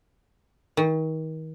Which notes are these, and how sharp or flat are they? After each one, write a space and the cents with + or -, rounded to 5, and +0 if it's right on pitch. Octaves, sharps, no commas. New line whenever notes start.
D#3 +35